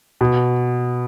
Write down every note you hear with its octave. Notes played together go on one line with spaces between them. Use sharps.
B2